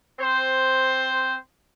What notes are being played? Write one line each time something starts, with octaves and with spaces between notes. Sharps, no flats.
C4 C5